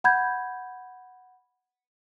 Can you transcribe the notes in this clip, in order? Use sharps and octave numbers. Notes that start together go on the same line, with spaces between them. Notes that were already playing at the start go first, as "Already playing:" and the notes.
F#5 B5 G6 G#6